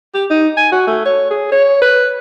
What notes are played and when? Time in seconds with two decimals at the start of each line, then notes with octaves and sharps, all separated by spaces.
0.14 G4
0.30 D#4
0.57 G#5
0.72 F#4
0.87 A3
1.05 C#5
1.31 G#4
1.52 C#5
1.82 B4